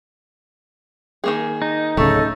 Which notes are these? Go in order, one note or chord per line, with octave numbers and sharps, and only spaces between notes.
D#3 A#3 G#4
D#4
D1 C#3 A3 A4